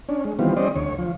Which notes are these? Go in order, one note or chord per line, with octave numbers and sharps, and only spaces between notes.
C#4 D4
G#3
D#3 E3 G3 B3 C4 F4
G3 C#4 C5 D5 D#5
D2 C#5
F3